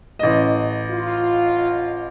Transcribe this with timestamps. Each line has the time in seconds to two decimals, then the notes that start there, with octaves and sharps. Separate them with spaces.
0.19 A1 D#5
0.90 F4